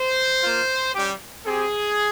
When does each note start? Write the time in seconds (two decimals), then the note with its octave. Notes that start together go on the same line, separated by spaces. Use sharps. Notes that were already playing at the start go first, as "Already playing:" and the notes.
Already playing: C5
0.43 A#3 F4
0.95 G3 C#4 G4
1.46 C4 G4 G#4